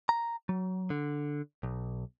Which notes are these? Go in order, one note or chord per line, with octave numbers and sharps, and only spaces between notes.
A#5
F#3
D3
B1